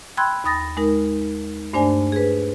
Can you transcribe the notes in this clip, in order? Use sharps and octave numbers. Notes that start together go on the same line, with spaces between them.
G5 B5 C6 E6 F#6 G#6
D#2 B5 D#6 A6 A#6
G#3 D#4 A#4
G2 A3 D4 C5 D5 G#5
G#4 B4